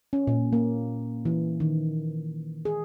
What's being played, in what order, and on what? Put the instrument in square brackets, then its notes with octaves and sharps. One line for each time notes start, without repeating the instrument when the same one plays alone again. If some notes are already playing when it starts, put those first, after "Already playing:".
[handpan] C#4
A#2
A#3
E3
D#3
G#4